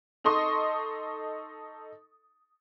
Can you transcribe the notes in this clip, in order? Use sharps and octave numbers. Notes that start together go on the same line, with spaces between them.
D#4 A4 D#5 C6 C#6 D#6